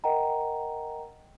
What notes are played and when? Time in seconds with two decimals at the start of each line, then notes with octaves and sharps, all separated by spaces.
0.04 A#4 D#5 F#5 G5 A#5